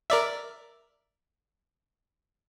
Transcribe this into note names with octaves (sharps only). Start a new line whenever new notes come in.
A#4 D5 E5